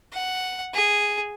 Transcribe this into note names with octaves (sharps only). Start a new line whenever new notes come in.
F#5
G#4